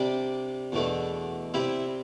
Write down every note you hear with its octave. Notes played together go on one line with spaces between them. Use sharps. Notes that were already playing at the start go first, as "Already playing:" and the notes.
Already playing: C3 G3 D4
E2 B2 A3 D4
C3 G3 C4 E4 E5